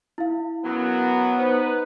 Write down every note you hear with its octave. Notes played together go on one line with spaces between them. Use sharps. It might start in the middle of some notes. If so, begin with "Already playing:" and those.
E4 F5
F#2 F#3 B3
D#4 B4 C5